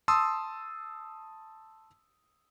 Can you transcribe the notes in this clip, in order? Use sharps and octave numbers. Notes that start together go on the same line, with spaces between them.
A5 C6 D#6 E6